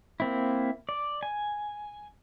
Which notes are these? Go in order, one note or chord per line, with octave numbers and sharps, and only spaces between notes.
A#3 C4 E4
D5
G#5